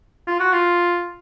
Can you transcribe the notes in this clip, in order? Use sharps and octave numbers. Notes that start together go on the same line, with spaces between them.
F4
F#4
F4